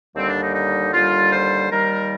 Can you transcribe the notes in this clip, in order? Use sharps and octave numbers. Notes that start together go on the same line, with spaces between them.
D#2 D3 G3 C4
D4
D#4
D#4
D#2 D3 G3 F4
C5
D#2 D#3 G3 A#4